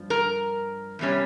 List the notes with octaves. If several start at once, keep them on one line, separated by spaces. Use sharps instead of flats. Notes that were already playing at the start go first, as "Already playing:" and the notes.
Already playing: G2 F3
A#4
E2 C3 G3 C#4